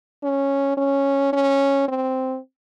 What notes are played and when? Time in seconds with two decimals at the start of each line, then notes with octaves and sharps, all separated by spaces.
0.23 C#4
0.77 C#4
1.33 C#4
1.88 C4